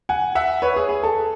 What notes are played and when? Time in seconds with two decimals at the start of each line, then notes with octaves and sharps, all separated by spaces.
0.09 F#5 G#5
0.35 E5 F#5
0.62 B4 C#5
0.76 G#4
0.89 G#4
1.03 A4